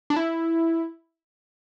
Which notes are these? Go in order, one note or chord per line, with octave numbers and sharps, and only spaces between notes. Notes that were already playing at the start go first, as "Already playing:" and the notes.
D4
E4